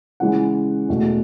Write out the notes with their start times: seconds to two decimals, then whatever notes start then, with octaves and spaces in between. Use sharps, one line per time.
0.20 C#3 E3 G#3 C#4 F#5
0.89 E2 B2 A3